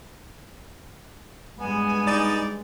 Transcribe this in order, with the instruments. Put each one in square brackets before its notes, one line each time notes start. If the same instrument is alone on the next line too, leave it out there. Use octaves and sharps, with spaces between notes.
[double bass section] G2 G#3 [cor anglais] B3 [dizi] G#5
[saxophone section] D#4 D5